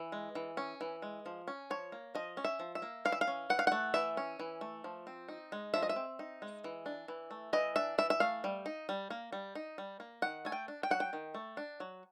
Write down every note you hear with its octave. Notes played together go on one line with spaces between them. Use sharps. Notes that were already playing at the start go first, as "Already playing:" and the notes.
Already playing: E3
G#3
E3
C#4
E3
G#3
F3
C#4
F3 C#5
A#3
F3 D#5
C#4
E5
F3
E5
A#3
E3 F5
E5
F5
C#4
E3 F#5
F5
A3 F#5
E3 E5
C#4
E3
A3
F3
C4
D#4
G#3
F3 E5
D#5
E5
C4
D#4
G#3
E3
D4
E3
A3
E3 D#5
D4 E5
E3 E5
E5
A3 F5
G3
D#4
G3
A#3
G3
D#4
G3
A#3
D#3 F#5
A3 G#5
G5
D4
G5
F#3 F#5
G5
D#3
A3
D4
F#3